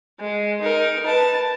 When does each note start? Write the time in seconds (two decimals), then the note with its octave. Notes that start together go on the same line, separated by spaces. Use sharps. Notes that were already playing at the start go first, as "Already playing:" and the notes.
0.19 G#3
0.61 D#4 A#4
1.06 B4 A5